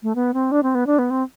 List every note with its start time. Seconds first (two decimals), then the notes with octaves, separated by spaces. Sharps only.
0.03 A3
0.15 B3
0.34 C4
0.51 D4
0.63 C4
0.75 B3
0.87 D4
0.99 B3
1.10 C4